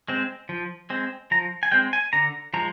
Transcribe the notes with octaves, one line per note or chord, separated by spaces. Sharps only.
G#3 C4
F3
G#3 C4
F3 A#5
G#5
G#3 C4 G5
G#5
D3 A#5
F3 G#3 A#5